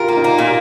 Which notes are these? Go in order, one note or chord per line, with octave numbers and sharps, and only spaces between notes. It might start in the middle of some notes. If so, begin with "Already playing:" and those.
Already playing: F4 G4 A#4
A#3
D#4
A#3
A#2 F4